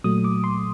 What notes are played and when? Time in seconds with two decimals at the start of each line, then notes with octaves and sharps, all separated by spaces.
0.04 A#2 F#3 A3 D#6
0.24 D6
0.44 C6